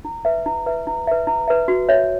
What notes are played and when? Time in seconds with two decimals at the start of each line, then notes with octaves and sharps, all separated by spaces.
0.05 E4
0.25 B4 E5
0.46 E4
0.66 B4 E5
0.87 E4
1.08 B4 E5
1.27 E4
1.48 B4 E5
1.68 F#4
1.89 C#5 E5